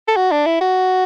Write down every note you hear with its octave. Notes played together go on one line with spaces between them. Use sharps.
A4
F#4
D4
E4
F#4